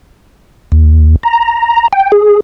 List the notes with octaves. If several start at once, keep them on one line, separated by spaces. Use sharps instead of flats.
D#2
A#5
G5
G#4